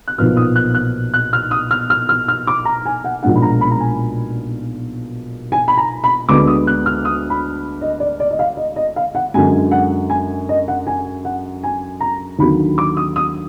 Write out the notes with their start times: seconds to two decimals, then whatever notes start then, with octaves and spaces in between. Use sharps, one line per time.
0.08 F#6
0.18 B1 A#2 F3 B3 D#4 F6
0.37 D#6
0.56 F#6
0.75 F#6
1.14 F#6
1.33 F6
1.51 D#6
1.71 F6
1.90 F6
2.09 F6
2.28 F6
2.47 D6
2.65 A#5
2.86 G#5
3.04 F#5
3.23 B1 A#2 F3 G#3 D4 F#5
3.35 B5
3.42 A#5
3.61 B5
3.71 A#5
3.80 G#5
5.52 G#5
5.68 B5
5.78 A#5
6.04 B5
6.29 D2 D3 G#3 B3 D4 D6
6.47 D#6
6.67 F#6
6.86 F6
7.05 D#6
7.30 B5
7.81 D#5
8.00 D5
8.20 D5
8.31 D#5
8.39 F5
8.57 D#5
8.76 D#5
8.96 F5
9.15 F#5
9.34 F#2 D3 G#3 G#5
9.71 F#5
10.10 G#5
10.49 D#5
10.68 F#5
10.87 G#5
11.25 F#5
11.63 G#5
12.00 A#5
12.39 D#2 D3 F#3 B5
12.78 D6
12.97 D#6
13.16 D#6